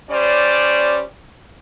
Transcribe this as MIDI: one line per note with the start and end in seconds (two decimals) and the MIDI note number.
0.10 1.03 55
0.10 1.03 61
0.10 1.03 72
0.10 1.03 74